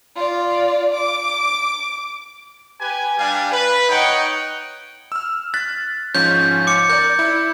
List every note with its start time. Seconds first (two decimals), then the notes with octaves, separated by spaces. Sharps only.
0.15 F4 D5
0.94 D6
2.80 G4 B4 G#5
3.17 G3 D4 F5 G#5
3.51 B4
3.89 D#4 C#5 F#5 G5
5.12 E6 F6
5.54 F#6 A6 B6
6.15 G#2 F3 C#4 G6
6.67 D6 C#7
6.90 A#4 D5 G6
7.19 E4